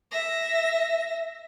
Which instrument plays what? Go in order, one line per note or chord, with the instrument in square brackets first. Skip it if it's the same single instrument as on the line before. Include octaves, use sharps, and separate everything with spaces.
[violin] E5 A#6